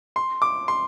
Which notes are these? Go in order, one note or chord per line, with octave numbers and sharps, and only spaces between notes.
C6
D6
C6